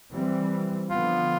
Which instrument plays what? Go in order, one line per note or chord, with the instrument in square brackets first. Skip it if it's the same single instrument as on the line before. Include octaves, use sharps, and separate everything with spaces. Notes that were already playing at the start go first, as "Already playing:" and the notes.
[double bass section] E3 G3 C4
[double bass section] D3 F3 B3 [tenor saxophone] F4